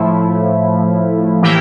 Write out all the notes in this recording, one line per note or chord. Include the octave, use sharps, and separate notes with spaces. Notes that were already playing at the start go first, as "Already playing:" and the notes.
Already playing: A2 F3 A3 E4
A2 E3 A#3 E4 G4